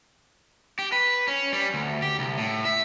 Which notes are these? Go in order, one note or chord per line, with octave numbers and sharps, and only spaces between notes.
G4
B4
C#4
G3
D2
G4
C2
A2
E5